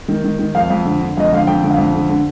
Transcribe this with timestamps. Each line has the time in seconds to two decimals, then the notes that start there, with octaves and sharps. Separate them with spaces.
0.08 D#3
0.24 D#3
0.39 D#3
0.55 F2 F5
0.70 F2
0.85 D3
1.01 D3
1.17 F2 D#5
1.32 D3 F5
1.47 F2 G5
1.64 D3
1.70 F5
1.78 F2
1.94 D3
2.09 D3